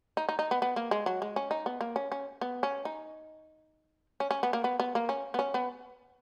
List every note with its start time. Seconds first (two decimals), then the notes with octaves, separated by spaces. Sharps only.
0.17 D#4
0.29 D#4
0.39 D#4
0.51 B3
0.62 B3
0.76 A#3
0.91 G#3
1.06 F#3
1.22 G#3
1.36 C#4
1.51 D#4
1.66 B3
1.81 A#3
1.96 C#4
2.12 C#4
2.41 B3
2.63 C#4
2.85 D#4
4.20 C#4
4.31 C#4
4.43 B3
4.53 A#3
4.64 B3
4.80 B3
4.95 A#3
5.09 C#4
5.34 B3
5.39 C#4
5.54 B3